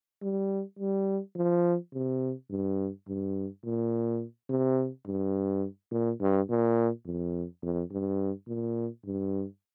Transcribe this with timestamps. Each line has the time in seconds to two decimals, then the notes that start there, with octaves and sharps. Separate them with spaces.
0.22 G3
0.79 G3
1.36 F3
1.93 C3
2.50 G2
3.08 G2
3.64 A#2
4.49 C3
5.06 G2
5.91 A#2
6.21 G2
6.49 A#2
7.06 F2
7.63 F2
7.91 G2
8.48 A#2
9.05 G2